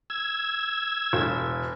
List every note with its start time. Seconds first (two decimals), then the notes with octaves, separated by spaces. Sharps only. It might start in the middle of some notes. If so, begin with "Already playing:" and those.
0.10 E6 G#6
1.13 E1